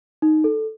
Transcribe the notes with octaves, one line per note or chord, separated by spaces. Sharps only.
D#4
A4